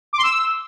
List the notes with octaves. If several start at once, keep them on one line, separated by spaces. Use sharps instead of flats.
D6
C6
E6